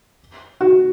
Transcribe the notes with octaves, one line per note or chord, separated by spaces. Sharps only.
F#4